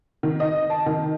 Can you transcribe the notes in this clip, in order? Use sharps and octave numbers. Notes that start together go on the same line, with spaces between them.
D#3
D#5
A5
D#3